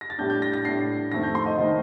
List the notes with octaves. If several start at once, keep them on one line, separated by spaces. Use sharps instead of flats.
A#6
A6
A2 G3 D4 G6
G6
A#6
A#6
A2 G3 D4 C7
F2 D#3 A3 C4 A#6
G6
C6
D#5
D#3 A3 C4 D#5